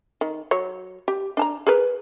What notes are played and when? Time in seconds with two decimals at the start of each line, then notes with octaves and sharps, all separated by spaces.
0.21 D#3
0.51 F#3 C#5
1.08 G4
1.37 D4 A5 A#5
1.67 G#4 A#4 B4